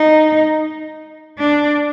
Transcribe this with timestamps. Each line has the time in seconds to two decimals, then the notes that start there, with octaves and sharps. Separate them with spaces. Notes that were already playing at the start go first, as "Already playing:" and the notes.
Already playing: D#4
1.39 D4